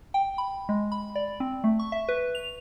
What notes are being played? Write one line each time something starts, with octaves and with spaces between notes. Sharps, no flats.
G5
B5
G#3
B5
D5
C4
A3
C#6
E5
B4
F7